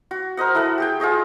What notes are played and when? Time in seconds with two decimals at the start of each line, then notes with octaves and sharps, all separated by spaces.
0.11 F#4
0.37 A#4 C5 D#5 F#5
0.55 E4 A4 E5 F#5
0.78 G4 G#4 G5
1.00 F4 G#4 D#5 C#6